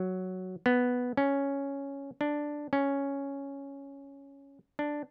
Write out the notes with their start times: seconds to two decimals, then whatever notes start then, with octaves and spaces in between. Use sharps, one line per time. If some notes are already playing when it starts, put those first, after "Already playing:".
Already playing: F#3
0.66 B3
1.17 C#4
2.21 D4
2.73 C#4
4.79 D4